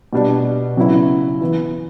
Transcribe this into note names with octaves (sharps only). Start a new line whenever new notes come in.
B2 G3 D4
C#3 F#3 B3 E4
E3 B3 E4